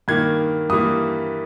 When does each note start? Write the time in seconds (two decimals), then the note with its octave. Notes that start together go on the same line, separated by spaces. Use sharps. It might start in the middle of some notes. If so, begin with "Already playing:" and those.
0.08 G2 D#3 A#3 G#6
0.70 G2 E3 G3 A#3 D#6